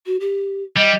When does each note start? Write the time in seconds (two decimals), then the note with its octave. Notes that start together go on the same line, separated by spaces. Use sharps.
0.06 F#4
0.20 G4
0.77 G3 D#5